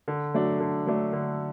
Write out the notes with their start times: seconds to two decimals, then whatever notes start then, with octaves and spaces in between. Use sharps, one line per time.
0.08 D3
0.34 F#3 A3 D4
0.60 D3
0.87 F#3 A3 D4
1.13 D3